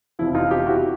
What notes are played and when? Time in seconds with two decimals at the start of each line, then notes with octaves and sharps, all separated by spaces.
0.19 F1 E2 C3 F3 E4
0.35 D#4 F4
0.51 F4 G4
0.67 E4 F#4